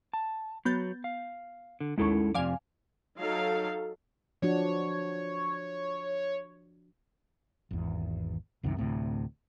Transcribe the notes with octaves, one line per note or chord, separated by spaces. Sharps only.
A5
F#3 B3 G6 A6
F5
D3
A1 D#2 G#3 C#4 E4 A4
F2 C3 D5 F5 G#5
F#3 D#4 A4 F5
F3 D4 F#4 C#5
G#1 E2
C2 F#2 C3 D#3
D2 A2 C3